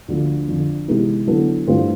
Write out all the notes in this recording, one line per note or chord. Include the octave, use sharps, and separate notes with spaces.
D2 D3 F3
F2 D3 F3
C3 E3 G#3 B3 D#4
D3 F#3 B3 E4 A4
G2 E3 A3 C4 F4